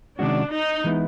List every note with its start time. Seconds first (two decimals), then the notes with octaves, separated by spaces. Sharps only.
0.19 C3 D#3 G#3 C#4 D4 F#4
0.52 D#4
0.84 E3 G#3 B3 E4